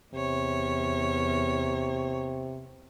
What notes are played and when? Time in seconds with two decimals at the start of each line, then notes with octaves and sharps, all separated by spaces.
0.14 E2 C3 C#5